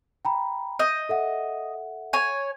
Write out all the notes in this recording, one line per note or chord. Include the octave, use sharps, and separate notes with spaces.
G5 A#5 B5
D#5 G6
A4 E5 F#5
C#5 G#5